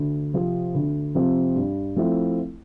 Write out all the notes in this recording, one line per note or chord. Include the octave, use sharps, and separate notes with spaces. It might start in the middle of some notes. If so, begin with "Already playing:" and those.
Already playing: D2
C3 F3 C4
D2
C3 F3 C4
G2
F3 A3 C4 E4